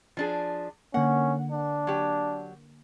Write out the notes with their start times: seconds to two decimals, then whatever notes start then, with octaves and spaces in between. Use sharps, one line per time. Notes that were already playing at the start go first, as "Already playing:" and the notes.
0.17 F3 D4 G#4
0.94 D3 A#3 C#4 F#5
1.52 D4
1.87 F#3 G4